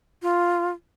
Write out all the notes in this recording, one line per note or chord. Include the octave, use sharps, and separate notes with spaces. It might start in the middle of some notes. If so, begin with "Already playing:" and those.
F4